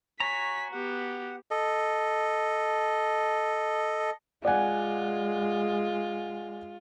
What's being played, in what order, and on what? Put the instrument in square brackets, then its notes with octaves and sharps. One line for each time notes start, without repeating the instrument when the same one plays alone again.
[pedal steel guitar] F#4 A#5 [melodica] C#5 G#5 [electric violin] B6
[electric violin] B3 G4 [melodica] F#5
[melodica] A4 D#5
[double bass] G#3 [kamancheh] F4 [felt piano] D5 F#5 G#5